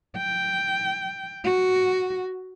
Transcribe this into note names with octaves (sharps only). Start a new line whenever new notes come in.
G5
F#4